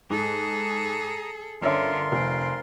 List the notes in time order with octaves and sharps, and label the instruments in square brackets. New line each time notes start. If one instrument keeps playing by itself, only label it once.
[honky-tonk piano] G#2 [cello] G#4 A4 [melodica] A#5 D#6
[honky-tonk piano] G1 C#4 E5 [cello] D3 [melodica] F4 A#4 C6
[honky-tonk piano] F1 [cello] C4